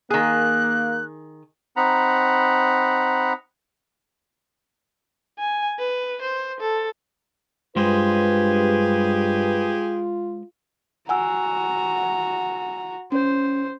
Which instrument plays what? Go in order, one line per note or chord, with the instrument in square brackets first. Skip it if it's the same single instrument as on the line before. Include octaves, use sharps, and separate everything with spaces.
[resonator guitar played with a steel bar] D#3 G#4 [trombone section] A#3 [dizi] F#6
[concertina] C4 D#4 F#5 A#5 B5
[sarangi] G#5
B4
C5
A4
[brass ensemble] G2 B4 [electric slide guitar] G#3 C5 [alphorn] F4 [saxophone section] G4 G#4
[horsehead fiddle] F#4 A#5 [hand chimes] F#5 G#5 E6
[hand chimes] C#4 [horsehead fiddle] C5